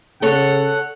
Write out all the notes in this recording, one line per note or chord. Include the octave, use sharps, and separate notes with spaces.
C#3 A4 C#5 F#5